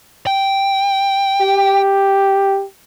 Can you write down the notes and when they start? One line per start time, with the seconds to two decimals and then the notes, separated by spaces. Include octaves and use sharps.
0.27 G5
1.41 G4